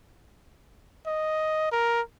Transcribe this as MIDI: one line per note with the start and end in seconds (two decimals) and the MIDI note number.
1.07 1.71 75
1.72 2.01 70